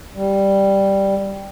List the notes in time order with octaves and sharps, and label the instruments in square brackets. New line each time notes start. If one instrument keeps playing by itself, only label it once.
[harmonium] G3